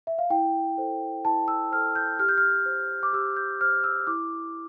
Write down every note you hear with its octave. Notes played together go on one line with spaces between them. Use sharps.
E5
F5
E4 G5
A4 C5
E4 A5
E6
A4 C5 F6
G6
G4 F6
G6
F6
C5
D6
G4 E6
G6
C5 F6
E6
E4 D6